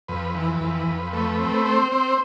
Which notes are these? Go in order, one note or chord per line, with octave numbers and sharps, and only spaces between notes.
F2 B4
E3
F2
F2
A3 B4
C4
B4
C4 C5
C4